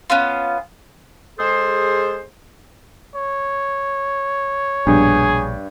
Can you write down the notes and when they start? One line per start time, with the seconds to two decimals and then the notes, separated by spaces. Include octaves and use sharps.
0.10 B3 C#4 F4
1.38 G#3 G#4 A4 C5
3.15 C#5
4.87 A#1 G2 B2 G#4